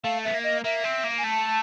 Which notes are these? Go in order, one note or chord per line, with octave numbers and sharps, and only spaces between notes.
A3 F5
B3 E5
A#3
D#5
A#3 E5
C4
A#3
G#5
A3 A5